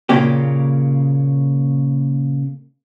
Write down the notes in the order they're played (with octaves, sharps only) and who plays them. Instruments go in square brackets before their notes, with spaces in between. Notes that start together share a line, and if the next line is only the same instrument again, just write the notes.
[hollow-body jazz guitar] A#2 C#3 A#3 G4